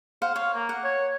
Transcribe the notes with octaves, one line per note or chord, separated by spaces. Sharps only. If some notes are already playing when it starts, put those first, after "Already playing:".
C5 F5 F#5
C#5 F5
A#3
F#5
C#5